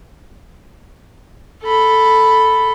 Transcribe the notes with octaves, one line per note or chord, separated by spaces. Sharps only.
A4 B5